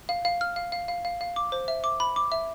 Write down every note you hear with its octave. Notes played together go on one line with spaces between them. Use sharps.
F5
F5
F6
F5
F5
F5
F5
F5
D6
C5
E5
D6
B5
D6
E5